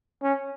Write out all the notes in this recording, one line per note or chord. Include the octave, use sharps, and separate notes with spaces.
C#4